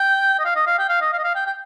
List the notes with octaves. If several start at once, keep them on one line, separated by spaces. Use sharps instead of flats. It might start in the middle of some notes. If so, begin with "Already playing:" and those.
Already playing: G5
D#5
F5
D#5
F5
G5
F5
D#5
F5
D#5
F5
G5
G5